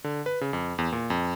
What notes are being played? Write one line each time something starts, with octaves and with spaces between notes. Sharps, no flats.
D3
B4
C#3
F2
E2
A#2
F2